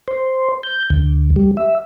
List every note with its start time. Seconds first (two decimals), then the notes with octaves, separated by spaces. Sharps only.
0.08 C5
0.63 G6
0.90 D2
1.36 G3
1.57 E5